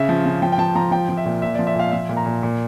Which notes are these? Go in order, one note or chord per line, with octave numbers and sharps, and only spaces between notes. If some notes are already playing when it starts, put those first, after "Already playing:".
Already playing: C#3 E5
F3
C#3
F3 G5
G5
F3 A5
F3 A#5
F3 G5
F3
E5
A#2
A#2 E5
D5
F3
E5
A#2 F5
F3 E5
A#2
A#5
A#2
A#2